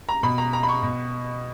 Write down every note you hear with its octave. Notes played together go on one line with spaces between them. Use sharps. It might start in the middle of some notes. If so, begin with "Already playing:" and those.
A#5
B2 B5
A#5
A#5
B5
C#6
B2